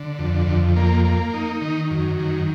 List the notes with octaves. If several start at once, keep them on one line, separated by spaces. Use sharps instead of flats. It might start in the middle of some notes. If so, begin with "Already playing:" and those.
Already playing: D3
F2
F2
A#3
A#3
D#4
D#3
F#2
D#3